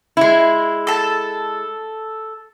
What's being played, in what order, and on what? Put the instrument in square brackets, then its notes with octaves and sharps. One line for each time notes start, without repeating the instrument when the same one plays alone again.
[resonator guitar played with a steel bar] G#3 E4
[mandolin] A4 A5